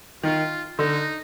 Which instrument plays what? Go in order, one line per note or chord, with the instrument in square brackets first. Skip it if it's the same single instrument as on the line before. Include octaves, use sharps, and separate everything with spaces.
[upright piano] D#3 [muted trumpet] F4
[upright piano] D3 [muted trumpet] D#4